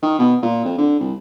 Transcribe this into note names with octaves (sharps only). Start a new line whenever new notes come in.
D#3
B2
A#2
F2
D3
C2